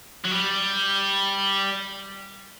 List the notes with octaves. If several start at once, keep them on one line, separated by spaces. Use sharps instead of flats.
F#3
G3